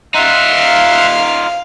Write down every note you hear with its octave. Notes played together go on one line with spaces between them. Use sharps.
D#4 F4 E5 F#5 C6
F5